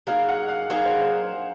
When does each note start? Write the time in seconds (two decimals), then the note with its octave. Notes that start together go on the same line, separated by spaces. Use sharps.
0.07 F#3 A#3 D#4 G#4 F5
0.29 F#5
0.48 F5
0.70 F#3 A#3 D#4 G#4
0.86 C5
1.01 C5